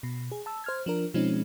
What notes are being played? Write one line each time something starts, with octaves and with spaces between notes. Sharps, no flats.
B2
G#4
A5 E6
C5 F6 G#6
F3 D4 A#4
B2 F3 G#3 C4 C#4 D#4